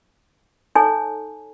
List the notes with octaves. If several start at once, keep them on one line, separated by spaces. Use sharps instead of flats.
D#4 A4 C#5 G#5